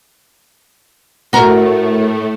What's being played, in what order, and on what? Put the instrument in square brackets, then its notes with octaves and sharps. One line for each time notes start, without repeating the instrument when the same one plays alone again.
[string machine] A2 A3 [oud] F#4 A#4